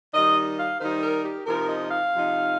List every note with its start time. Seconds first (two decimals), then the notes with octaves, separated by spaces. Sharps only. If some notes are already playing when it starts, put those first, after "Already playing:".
0.14 D#3 G3 D#4 D#5
0.58 F5
0.80 D#3 G3 D#4 C5
1.02 A#4
1.25 G4
1.47 C3 F3 D#4 A#4
1.69 D#5
1.91 F5
2.13 C3 F3 D#4